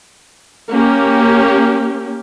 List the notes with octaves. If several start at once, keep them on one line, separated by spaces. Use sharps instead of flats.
A#3 C#4 G4